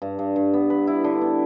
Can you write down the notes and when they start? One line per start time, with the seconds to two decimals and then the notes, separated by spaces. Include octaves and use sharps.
0.02 G2
0.19 G2
0.36 G2
0.53 B3
0.70 B4
0.87 E4
1.04 D3
1.21 B3